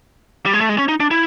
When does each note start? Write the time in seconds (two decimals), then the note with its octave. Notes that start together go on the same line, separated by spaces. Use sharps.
0.46 G3
0.53 G#3
0.61 A3
0.69 G#3
0.78 C#4
0.89 D#4
1.00 D4
1.11 E4